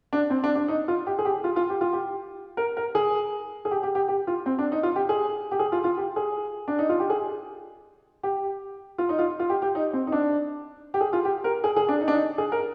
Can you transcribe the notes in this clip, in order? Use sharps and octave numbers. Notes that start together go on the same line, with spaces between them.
D4
C4
D4
D4
D#4
F4
G4
G#4
G4
F4
F4
G4
F4
G4
A#4
A#4
G#4
G#4
G4
G4
G4
G4
F4
C4
D4
D#4
F4
G4
G#4
G4
G#4
F4
F4
G4
G#4
D4
D#4
F4
G4
G#4
G4
F4
D#4
F4
F4
G4
G4
D#4
C4
D#4
D4
G4
G#4
F4
G4
A#4
G#4
G#4
D4
D#4
D4
D#4
G#4
A#4